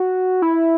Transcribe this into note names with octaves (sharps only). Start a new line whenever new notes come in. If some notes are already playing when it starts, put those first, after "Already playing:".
Already playing: F#4
E4